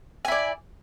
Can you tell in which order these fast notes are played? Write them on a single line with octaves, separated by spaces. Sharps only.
G#5 E4 D5